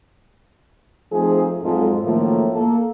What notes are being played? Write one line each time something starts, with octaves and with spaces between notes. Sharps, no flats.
F3 A3 C4 D#4 G#4
F2 G#2 F#3 G#3 F4 A4
F#2 A2 D#3 F3 A3 A#3
A#3 A4